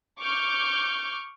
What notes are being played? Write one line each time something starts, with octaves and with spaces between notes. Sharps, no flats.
C#6 D6 F6 G6